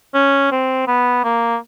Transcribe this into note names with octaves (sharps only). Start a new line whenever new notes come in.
C#4
C4
B3
A#3